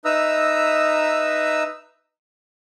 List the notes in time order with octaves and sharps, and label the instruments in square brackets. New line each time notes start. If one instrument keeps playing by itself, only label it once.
[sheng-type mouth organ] D#4 B4 E5 A#5 D#6 E6